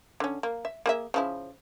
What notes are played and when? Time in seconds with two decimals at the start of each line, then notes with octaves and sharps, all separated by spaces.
0.20 D3 C#4
0.43 A#3
0.65 E5
0.86 A#3 G#4 E5
1.14 C#3 F3 E4